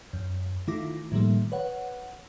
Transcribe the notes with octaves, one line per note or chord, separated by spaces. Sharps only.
F#2
D#3 A3 E4 F4 D6 A#6
A2 D#3 F3 G3 A3 A#3
B4 C#5 F#5